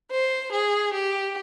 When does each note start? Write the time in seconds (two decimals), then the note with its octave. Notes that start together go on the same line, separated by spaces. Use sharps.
0.12 C5
0.52 G#4
0.94 G4